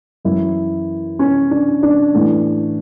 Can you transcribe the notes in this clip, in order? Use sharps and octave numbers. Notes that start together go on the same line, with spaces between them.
F#2 E3 E4
C#4
D4
D4
A2 E3